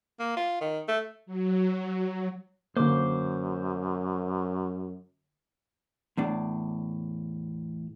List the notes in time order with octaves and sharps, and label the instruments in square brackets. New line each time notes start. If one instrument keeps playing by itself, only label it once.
[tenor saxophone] A#3
F4
D#3
A3
[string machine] F#3
[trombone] F#2 [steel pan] D3 A#3 [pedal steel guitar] C5 D6
[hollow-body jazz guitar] E2 A2 D4